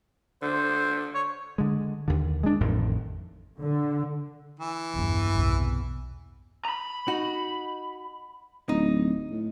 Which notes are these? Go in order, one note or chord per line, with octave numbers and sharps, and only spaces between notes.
D3 C5
C#5
D3 G#3
D#2 D3
G#3 D4
A1 F2 A2 D#3
D3
E3
A#1 E2 G2 C#3
B1 E2 C3
A#5 B5
D#4 F#4
D1 D#4
A2